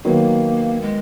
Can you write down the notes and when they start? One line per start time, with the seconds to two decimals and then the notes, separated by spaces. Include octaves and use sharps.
0.04 D#3 F#3 A#3 B3
0.81 G#3